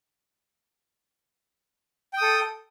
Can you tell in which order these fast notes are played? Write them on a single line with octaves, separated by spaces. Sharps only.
G5 D#6 A4